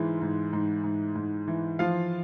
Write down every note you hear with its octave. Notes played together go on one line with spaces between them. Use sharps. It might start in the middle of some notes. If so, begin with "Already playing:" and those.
Already playing: G#2 E3 G#3
G#2
G#2
G#2
G#2
E3
F3 F4 F5